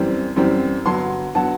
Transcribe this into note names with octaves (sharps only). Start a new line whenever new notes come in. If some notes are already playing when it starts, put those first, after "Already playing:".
Already playing: F#2 E3 G3 C4
F#2 E3 G3 C4
G2 D3 F#3 B3 A5 C6
D3 F#3 B3 F#5 A5